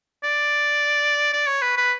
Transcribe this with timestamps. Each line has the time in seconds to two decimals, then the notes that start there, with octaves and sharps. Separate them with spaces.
0.24 D5
1.33 D5
1.47 C#5
1.62 B4
1.77 B4